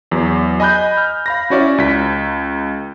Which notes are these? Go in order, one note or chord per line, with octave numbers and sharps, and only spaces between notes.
E2 F#3
D#5 G#5 B5 F#6 G6
F6
F5 B5 A#6
C#4 E4 F#4 C#5 D5 E5
C#2 B6